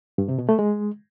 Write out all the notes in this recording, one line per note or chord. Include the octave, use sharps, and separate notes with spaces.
G2
C3
B2
A3
G#3